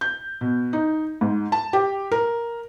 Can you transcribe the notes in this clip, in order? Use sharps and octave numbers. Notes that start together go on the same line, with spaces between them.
G6
B2
D#4
G#2
A5
G4
A#4